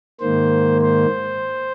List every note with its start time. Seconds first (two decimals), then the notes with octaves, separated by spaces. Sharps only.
0.20 G#2 D#3 A#3 C5
0.81 C5